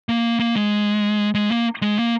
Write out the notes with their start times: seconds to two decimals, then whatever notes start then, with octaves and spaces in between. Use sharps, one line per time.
0.09 A#3
0.40 A#3
0.56 G#3
1.35 G#3
1.51 A#3
1.82 G#3
1.99 A#3